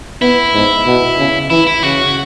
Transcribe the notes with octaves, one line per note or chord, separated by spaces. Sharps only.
B3 E4
G#2
B2
C#3
E3 E4
E4
C#3 F#4